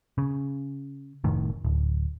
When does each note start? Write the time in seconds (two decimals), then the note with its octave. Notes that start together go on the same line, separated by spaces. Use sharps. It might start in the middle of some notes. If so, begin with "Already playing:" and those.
0.18 C#3
1.24 F1 A2 D#3
1.65 D1